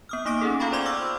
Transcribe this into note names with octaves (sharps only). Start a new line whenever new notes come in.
B3 D#6 F6
A#3 D#4 D6 D#6 A#6 D7
C#4 D#4 G#4 A4
F4 F5 G5 B5 C#6
C5 D5 C6 D6 G#6
F5 C#6 E6 F6